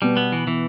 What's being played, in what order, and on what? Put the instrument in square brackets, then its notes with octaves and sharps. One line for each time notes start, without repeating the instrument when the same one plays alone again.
[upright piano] B2 [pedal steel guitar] G3
[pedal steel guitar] B3
E3
E3